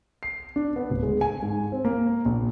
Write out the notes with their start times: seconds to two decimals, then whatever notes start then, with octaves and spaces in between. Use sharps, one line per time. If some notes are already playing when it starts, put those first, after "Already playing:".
0.23 C7
0.56 D4
0.76 B3
0.90 D1
1.03 G#3
1.21 G#5
1.42 G#2
1.72 C4
1.85 A#3
2.25 A#1